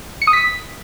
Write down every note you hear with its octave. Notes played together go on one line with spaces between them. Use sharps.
C#7
D#6
B6